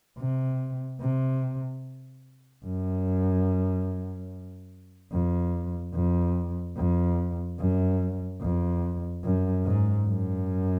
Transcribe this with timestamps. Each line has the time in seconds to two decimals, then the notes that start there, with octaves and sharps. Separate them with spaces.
0.18 C3
1.01 C3
2.65 F#2
5.12 F2
5.95 F2
6.77 F2
7.59 F#2
8.41 F2
9.24 F#2
9.65 G#2
10.06 F#2